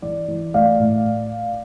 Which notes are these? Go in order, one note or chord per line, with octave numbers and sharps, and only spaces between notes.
E3 D5
E3
A3 D5 F5
A2